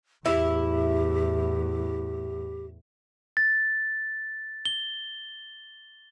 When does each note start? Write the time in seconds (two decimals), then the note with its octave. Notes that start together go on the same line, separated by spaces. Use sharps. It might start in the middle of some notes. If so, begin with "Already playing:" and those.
0.26 E2 A2 E4 G4
3.37 A6
4.65 G7